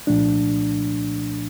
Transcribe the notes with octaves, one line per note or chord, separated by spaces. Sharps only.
C2 A#2 F3 A3 D4